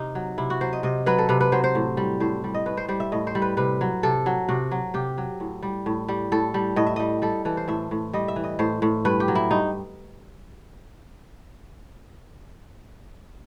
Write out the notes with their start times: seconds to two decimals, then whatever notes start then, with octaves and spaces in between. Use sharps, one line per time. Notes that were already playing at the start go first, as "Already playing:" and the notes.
Already playing: C3 D#4
0.15 F#3
0.38 C3 E4
0.50 F#4
0.61 F#3 C5
0.73 D#5
0.83 C3 D#5
1.06 F#3 B4
1.18 A4
1.29 C3 B4
1.41 B4
1.52 F#3 C5
1.64 C5
1.75 A2
1.97 G3
2.20 A2 C5
2.44 G3
2.54 D#5
2.66 A2 B4
2.77 C5
2.89 G3 C5
3.00 E5
3.12 A2 D#5
3.27 C5
3.35 G3
3.42 B4
3.57 C3 B4
3.81 F#3
4.03 C3 A4
4.26 F#3
4.49 C3 F#4
4.71 F#3
4.94 C3 G4
5.18 F#3
5.40 A2
5.63 G3
5.86 A2
6.09 G3
6.32 A2 A4
6.54 G3
6.76 A2 D#5
6.87 E5
6.96 G3 D#5
7.22 G3 A4
7.45 E3 A4
7.57 C5
7.68 A2 E5
7.91 A2
8.13 G3 D#5
8.28 E5
8.36 E3
8.44 D#5
8.59 A2 C5
8.82 A2
9.05 G2 B4
9.20 G4
9.28 F#3
9.35 E4
9.51 G2 D#4